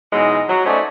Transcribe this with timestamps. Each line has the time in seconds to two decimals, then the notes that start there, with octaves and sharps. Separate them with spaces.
0.13 B2 E3 F#3 G#3 D#4
0.49 F#3
0.66 A3 C#4 D#4 F#4 C5 D5